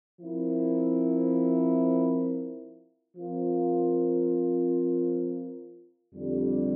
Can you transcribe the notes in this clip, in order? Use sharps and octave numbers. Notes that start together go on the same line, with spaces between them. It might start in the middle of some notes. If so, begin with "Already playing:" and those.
F3 C4 E4 A#4
F3 C4 F4 A#4
F2 D3 G3